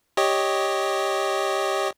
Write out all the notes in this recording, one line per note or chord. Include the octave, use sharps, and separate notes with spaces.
G4 C#5 D#5